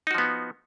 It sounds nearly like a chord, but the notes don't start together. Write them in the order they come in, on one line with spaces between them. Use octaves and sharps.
D#4 F#4 F3 B3